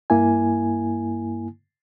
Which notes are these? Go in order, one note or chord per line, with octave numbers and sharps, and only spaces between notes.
G2 A#3 E4 G#5